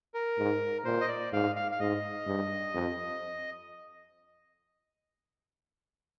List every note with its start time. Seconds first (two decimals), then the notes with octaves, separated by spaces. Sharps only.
0.14 A#4
0.38 G#2
0.85 A#2 C5
1.01 D#5
1.08 D5
1.32 G#2 F5
1.56 F5
1.72 F5
1.80 G#2 D#5
2.27 G2
2.74 F2